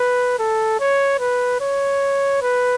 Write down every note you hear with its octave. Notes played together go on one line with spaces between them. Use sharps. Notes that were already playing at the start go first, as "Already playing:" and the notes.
Already playing: B4
A4
C#5
B4
C#5
B4